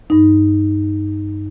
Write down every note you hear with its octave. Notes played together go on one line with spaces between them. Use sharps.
G2 D#4